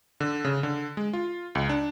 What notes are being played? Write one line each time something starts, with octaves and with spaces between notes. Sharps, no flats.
D3
C#3
D3
G#3
F4
C#2
D4